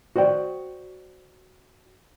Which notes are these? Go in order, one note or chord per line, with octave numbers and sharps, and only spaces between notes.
F#4 C5 D5 G5